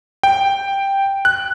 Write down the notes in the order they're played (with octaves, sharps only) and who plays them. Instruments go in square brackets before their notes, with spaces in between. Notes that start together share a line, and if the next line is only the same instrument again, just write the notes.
[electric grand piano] G5
F#6